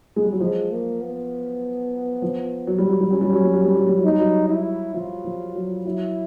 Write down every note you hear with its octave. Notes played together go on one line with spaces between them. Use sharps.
G#3
G3
F#3
F3 G#3
A#3
B3
F3
F#3
G3
F#3
G3
F#3 C#4
G3
F#3
G3
F#3
G3
F#3
G3
F#3
G3 D#4
F#3
E4
F3 F4
F3
F#3
F#3 E4